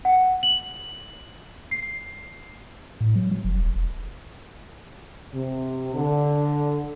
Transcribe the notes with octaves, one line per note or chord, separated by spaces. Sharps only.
F#5
F#7
C7
A2
F#3
F#3
F#1
D#1
E1
C3
D3